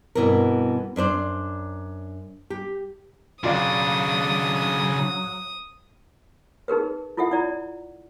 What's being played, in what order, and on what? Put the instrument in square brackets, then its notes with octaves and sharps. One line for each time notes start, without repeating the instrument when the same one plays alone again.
[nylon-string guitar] G2 B2 E3 C4 A#4
F#2 D4 C5 D5
G4
[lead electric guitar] C#3 D4 [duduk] F#3 [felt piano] F4 D5 F5 [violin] D#6
[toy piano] D#4 G#4 A#4 B4
E4 F4 A4 E5 F#5
E4 D5 A#5